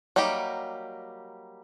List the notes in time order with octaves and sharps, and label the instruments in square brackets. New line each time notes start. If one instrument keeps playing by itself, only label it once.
[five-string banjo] F#3 G3 A#3 D#4 G4